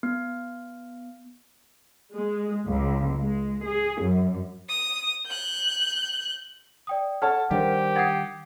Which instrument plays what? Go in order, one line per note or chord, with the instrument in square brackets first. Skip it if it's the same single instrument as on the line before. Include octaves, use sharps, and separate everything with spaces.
[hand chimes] B3
[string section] G#3
C#2
G#3
G#4
F#2
[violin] D#6
F#6 G6
[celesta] D5 G5 D#6
[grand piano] A4 C#5 A5 [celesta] F#5 F6 G#6
[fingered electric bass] D#3 G3 [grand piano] D4 A#4 C5 [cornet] G4
[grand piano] F#5 D#6 C7 [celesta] G#6 A6